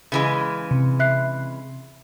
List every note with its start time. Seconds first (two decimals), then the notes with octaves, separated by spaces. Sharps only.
0.12 C#3 E3 G#3
0.71 C3
1.00 E5 F#6 C7